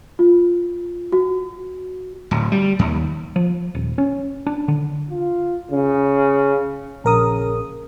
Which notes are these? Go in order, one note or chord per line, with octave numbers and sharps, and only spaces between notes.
F4
F#4
D1
G3
D#2
F3
D#1
C#4
D4
D3
F4
C#3
A#1 C#3 A#4 D#6